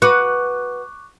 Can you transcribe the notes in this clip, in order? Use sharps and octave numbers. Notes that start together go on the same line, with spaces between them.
F#4 B4 C#6 D6 F#6